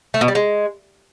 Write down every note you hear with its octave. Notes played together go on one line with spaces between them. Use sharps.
A3
B2
G3
G#3